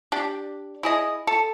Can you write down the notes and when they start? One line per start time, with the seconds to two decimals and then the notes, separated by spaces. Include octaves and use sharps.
0.12 D4 G4
0.83 E4 G#4 D#5
1.27 A4